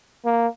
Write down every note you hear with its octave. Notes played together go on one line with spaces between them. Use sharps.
A#3